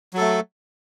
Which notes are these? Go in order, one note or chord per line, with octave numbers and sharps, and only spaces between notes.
F#3 A3 A4